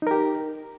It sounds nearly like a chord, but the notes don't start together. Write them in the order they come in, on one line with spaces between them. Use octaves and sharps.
D#4 A#4 G4